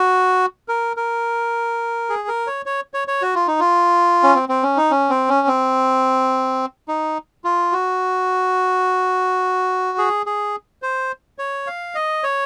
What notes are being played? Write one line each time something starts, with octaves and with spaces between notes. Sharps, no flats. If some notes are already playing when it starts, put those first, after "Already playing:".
Already playing: F#4
A#4
A#4
G#4
A#4
C#5
C#5
C#5
C#5
F#4
F4
D#4
F4
C#4
C4
C4
C#4
D#4
C#4
C4
C#4
C4
D#4
F4
F#4
G#4
G#4
C5
C#5
F5
D#5
C#5